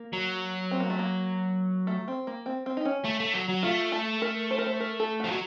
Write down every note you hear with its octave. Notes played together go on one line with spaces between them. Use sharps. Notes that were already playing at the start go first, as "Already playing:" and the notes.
Already playing: A#3
F#3
C4
A#3
A3
A#3
A3
C4
A#3
C4
C4
D#4
C#4
A3
A3
F#3
F#3
A3 F4
A4
A#4
C5
A#4
C5
A#4
A4
F3 F#4
F#3